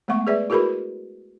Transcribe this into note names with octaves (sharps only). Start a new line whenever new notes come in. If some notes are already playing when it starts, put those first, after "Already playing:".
G#3 A3 B3 F#5 C#6
G#4 B4 D5 E5
E4 F#4 G#4 A#4 B4 B5